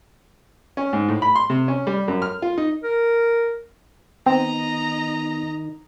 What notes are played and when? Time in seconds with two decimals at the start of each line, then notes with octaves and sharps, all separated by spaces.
0.77 C#4
0.93 G#2
1.09 A2
1.22 B5
1.36 C6
1.50 C3
1.68 C#4
1.87 G3
2.08 F#2
2.22 F6
2.42 F4
2.58 D#4
2.84 A#4
4.26 D#3 B3 C4 D#4 D#5 A#5